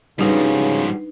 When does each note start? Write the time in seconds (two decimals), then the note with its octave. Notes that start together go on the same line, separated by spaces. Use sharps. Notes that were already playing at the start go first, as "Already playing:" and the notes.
0.19 G#2 C#3 F3 G3 D4 D#4 F#4 B4